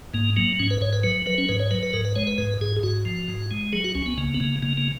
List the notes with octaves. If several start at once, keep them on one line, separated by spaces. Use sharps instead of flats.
G#2 A#3
F#3 A#3
G#2 C#4
B4
G#2 C#5
B4
F#3 B4
F#3 B4
C#4
G#2 B4
C#5
F#3 B4
B4
G#2 A#4
B4
G#3 C#5
B4
G#2 B4
G#2 G#4
G#4
G#2 F#4
F3
G#2
G#3
F#3 G#4
F#4
C#2 C#4
B3
C#3 A#3
B3
C#3 A#3
C#3 A#3
A#3